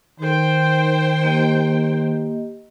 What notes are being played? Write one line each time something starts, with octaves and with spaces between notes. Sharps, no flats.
D#3 C5 G5
A#3 G4 D#5